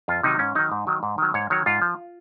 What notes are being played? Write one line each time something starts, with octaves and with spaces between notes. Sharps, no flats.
F2 F4
C3 D#3 F#3 D#4
G#2 C#4
D#3 F#3 D#4
G#2
D#3 F#3
G#2
D#3 F#3
G#2 C#5
D#3 F#3 C#5
G#2 F4
F3